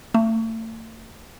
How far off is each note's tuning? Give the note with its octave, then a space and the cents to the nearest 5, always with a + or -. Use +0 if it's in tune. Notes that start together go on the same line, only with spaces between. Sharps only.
A3 +35